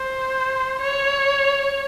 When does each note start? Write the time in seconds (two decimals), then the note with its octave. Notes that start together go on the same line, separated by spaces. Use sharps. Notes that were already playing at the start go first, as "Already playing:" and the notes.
Already playing: C5
0.80 C#5